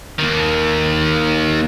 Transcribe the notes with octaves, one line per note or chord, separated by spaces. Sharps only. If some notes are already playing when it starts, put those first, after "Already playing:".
D#2 D#3